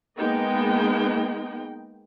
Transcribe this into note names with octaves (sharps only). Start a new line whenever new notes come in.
G#3 A#3 B3 D#4 D#5 G5